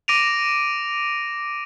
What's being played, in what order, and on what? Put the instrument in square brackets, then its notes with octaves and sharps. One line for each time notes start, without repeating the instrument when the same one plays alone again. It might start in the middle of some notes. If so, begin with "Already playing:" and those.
[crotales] D6 A#6 D7 D#7 F7